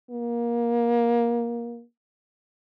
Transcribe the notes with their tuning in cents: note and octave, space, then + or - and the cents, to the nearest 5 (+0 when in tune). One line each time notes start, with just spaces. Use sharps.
A#3 +20